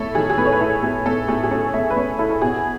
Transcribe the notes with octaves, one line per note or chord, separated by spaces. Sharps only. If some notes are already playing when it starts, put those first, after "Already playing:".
Already playing: A3 E4 A4 C#5
D#3 G#4
G#4
A3 B4
C#5
B4
E4 A4
A3 G#4
A3 A4
A3 G#4
G#4
C#4 A4
A3 E5
B4
A3 C#5
E4 A4
A4
B2 G#4